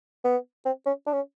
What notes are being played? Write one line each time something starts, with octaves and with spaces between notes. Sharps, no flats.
B3
C4
C#4
D4
C#4